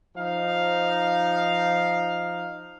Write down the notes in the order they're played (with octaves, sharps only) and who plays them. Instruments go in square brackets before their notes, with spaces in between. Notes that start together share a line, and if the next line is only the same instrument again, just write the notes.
[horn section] F3 D#4 F5